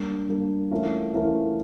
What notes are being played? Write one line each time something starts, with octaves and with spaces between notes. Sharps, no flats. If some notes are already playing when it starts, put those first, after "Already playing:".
Already playing: G3 A#3 D4
G3 A#3 D4
E3 A3 C#4 F4 A#4
E3 A3 C#4 F4 A#4